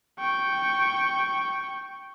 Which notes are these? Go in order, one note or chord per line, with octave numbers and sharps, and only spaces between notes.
G5 C#6